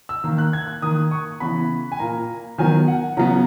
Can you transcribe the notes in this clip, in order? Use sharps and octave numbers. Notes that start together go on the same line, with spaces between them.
E6
D#3 A#3
F#6
G#6
F#6
D#3 A#3 D#6
C#6
C#3 E3 B3 B5
G#5
A#2 A#3 A#5
D#3 F#3 B3 G#5
F#5
C#3 F#3 B3 A#5